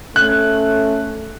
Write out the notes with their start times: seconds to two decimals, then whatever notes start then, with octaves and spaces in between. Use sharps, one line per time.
0.16 A3 C#4 F#6